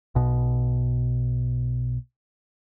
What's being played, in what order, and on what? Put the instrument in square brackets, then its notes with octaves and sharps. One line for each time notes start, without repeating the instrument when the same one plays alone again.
[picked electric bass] B1 B2